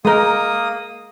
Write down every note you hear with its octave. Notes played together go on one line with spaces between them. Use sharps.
G#3 A#3 A#4 D#6